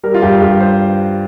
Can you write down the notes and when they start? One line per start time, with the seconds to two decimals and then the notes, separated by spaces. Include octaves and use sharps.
0.03 G3 A#4
0.14 F4
0.22 G2 G4
0.41 G2 G4
0.61 C5